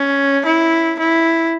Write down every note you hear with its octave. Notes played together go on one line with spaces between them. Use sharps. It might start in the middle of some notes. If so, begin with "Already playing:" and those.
Already playing: C#4
E4
E4